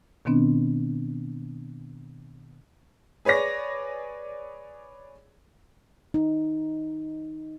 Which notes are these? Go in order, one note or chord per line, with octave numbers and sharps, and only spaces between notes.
B2 D#3 B3 C4 D4
G#4 B4 C#5 D5 A#6
D#4